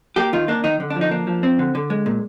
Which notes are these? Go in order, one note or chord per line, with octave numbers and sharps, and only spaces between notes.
A#3 G4
D#3 F4
A#3 D4
D#3 D#4
D3
D4
F3
D#4
A#3 D4
F3
C4
D3
D3
G#3
A#2